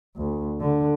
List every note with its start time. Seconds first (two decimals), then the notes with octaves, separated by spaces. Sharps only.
0.17 D2
0.61 D3